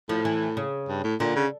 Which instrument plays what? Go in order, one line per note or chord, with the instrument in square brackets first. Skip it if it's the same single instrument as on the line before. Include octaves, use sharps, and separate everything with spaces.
[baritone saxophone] A2 [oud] F3
[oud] E3
C#3
[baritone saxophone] G2
A2
[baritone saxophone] A#2 [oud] D3
[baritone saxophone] C#3